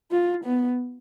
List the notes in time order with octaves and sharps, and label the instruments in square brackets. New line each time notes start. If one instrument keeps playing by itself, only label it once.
[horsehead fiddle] F4
B3